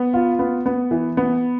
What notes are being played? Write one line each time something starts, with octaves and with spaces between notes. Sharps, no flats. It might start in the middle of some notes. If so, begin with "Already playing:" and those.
Already playing: B3
F4
B3
B3
E3
B3